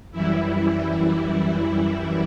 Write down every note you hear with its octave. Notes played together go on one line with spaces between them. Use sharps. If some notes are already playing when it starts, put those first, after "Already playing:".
F#2 E3 G3 E4